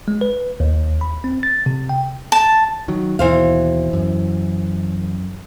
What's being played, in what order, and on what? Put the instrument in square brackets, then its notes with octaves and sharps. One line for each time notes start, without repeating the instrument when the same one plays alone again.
[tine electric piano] G#3
B4
D#2
B5
C4
A6
C3
G5
[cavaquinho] A5
[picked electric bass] D#3 F#3
[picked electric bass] D#2 B2 [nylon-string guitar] E3 C5 F5
[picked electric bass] F#2